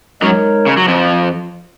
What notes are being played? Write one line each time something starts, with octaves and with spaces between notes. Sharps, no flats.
F#2 F#3 G#3 D#4 A#4 C#5
C#3
F#3
F2 F3